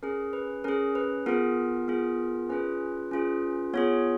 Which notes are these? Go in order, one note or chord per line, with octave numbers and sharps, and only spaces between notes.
C#4 G#4 A#4
B4
C#4 G#4 A#4
B4
B3 F4 G#4 A#4
B3 F4 G#4
C#4 F4 G#4 B4
C#4 F4 G#4
B3 F4 G#4 C#5